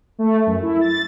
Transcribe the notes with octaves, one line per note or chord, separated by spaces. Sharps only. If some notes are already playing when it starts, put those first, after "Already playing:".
A3
F#2
E4
A6